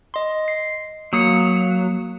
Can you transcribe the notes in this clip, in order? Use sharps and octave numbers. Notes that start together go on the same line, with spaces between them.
D#5 C6
C7
F#3 A#3 D#6 C#7